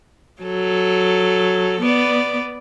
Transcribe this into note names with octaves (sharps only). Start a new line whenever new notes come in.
F#3 A4
B3 D5